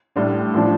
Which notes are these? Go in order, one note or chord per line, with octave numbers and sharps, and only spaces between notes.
A2 G3 D4
A2 F3 D4